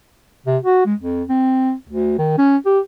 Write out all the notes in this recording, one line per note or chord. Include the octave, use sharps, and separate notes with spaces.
C3
F#4
G#3
F2
C4
D2
D#3
C#4
G4